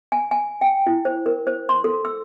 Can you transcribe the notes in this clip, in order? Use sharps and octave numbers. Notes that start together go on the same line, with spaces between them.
G#5
G#5
G5
E4
C5
A#4
C5
C6
A4
E6